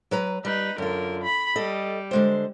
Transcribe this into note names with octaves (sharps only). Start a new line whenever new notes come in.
F#3 B4 A#5
G3 D#4 B4
F#2 D3 F4 A#4
B5
G3 A4 D#5
D3 G#3 C5